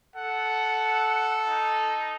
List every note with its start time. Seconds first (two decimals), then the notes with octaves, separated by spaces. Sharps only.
0.16 A4 F#5
1.48 D#4